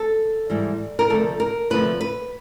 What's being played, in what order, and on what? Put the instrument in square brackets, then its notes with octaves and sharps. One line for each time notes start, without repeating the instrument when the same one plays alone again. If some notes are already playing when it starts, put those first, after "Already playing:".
Already playing: [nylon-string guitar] A4
G#2 E3 G3
A#4
D2 C3 F3 A3 A4
A#4
D2 C3 F3 A3 B4
B4